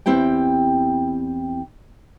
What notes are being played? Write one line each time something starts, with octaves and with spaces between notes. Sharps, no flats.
E2 C4 E4 G4 G5